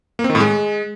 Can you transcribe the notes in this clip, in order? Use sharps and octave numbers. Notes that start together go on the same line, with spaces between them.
A#3
C4
D#3
A2
G#3